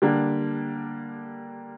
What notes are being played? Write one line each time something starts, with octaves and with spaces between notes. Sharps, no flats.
D3 G3 A#3 D4